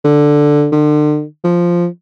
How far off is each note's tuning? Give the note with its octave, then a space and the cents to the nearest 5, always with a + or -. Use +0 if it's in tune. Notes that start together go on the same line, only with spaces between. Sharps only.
D3 +5
D3 +35
F3 -5